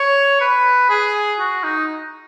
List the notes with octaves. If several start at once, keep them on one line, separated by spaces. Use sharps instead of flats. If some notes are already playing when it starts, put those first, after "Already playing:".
Already playing: C#5
B4
G#4
F#4
D#4